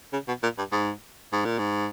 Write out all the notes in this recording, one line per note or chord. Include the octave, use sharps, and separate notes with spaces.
C#3
B2
A#2
G2
G#2
G#2
A#2
G#2